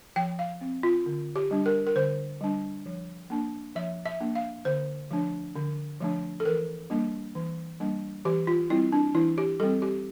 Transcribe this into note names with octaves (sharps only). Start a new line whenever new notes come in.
F3 G5
F5
C4
F4
D3
G4
G3 D4
A#4
A#4
D3 C5
G3 D4
F3
A#3 D4
F3 E5
E5
A#3 D4
F5
D3 C5
F3 A3 D4
D3
F3 A3 D4
A4
E3 A#4
G3 A#3 D4
E3
G3 A#3 D4
E3 G4
F4
G3 C4 E4
D4
E3 E4
G4
G3 C4 A4
G4